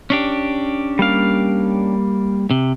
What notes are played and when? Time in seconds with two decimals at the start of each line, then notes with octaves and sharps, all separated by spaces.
0.10 C#4 D4 G4
0.99 G3 A#3 F5
2.51 C3